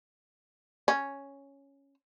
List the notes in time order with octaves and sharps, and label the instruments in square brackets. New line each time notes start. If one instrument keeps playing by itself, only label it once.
[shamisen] C#4